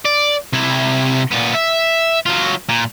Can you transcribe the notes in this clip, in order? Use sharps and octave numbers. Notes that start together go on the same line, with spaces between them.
D5
C3 E4
A#2 B3
E5
F#3 F4
A#2